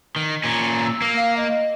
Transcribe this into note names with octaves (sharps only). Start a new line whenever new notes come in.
D#3
A#2 C#4
E6
A#3
F5
D#5